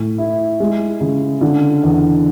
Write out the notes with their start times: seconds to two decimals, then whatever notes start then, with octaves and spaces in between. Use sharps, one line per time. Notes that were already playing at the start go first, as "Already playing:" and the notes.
Already playing: A2
0.18 E4
0.60 G#3
1.01 C#3
1.41 D3
1.83 E2